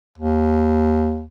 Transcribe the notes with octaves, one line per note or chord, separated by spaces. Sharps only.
D#2